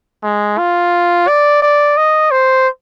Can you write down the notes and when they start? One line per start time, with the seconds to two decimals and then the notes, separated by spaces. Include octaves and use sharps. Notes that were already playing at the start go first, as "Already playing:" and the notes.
0.23 G#3
0.58 F4
1.28 D5
1.62 D5
1.97 D#5
2.31 C5